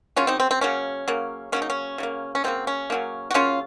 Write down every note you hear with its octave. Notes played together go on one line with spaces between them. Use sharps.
C#3 F#3 A#3 C#4 F4
C4 D#4
C4
C4
C#3 F#3 A#3 C#4
C#3 F#3 A#3
C#3 F#3 A#3 C#4
D#4
C#4
C#3 F#3 A#3
C#4
C#3 F#3 A#3 C4
C#4
C#3 F#3 A#3
F#4
C#3 F#3 A#3 C#4 F4